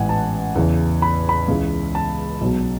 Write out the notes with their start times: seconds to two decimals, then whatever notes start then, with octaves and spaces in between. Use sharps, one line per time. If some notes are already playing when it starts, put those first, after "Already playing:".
Already playing: A1 G#2 E3 F#5 G#5
0.09 A5
0.55 E2 C#3 E3
1.02 B5
1.29 B5
1.48 C#2 C#3 E3
1.95 A5
2.41 B1 B2 F#3